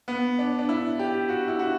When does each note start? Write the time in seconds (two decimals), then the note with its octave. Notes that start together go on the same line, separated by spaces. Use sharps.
0.08 B3
0.39 D4
0.59 D4
0.69 E4
0.99 G4
1.29 F#4
1.48 E4
1.59 F#4